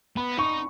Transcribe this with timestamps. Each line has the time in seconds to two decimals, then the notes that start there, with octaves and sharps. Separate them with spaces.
0.17 B3 B5
0.38 D#4 C#6